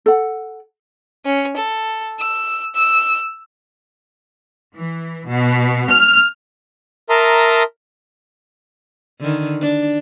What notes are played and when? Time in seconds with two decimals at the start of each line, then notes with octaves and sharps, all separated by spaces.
0.06 A4 F#5
1.25 C#4
1.56 A4
2.20 E6
2.75 E6
4.75 E3
5.27 B2
5.89 F6
7.10 A#4 E5 A5 A#5 C6 D#6
9.20 D3 D#3
9.61 D4